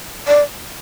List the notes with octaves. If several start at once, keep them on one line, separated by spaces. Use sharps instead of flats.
D5